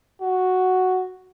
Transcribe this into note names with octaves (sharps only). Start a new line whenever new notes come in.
F#4